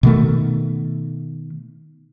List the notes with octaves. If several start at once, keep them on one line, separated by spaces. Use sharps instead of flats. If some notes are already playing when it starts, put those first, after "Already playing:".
B2 D#3 A3